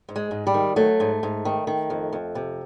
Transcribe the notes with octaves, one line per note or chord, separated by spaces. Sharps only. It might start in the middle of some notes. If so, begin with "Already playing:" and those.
G#2
G#3
G#2
G3
D#3
F#3 A3
G#2
G#2
D#3
D#3
F2
F2
C3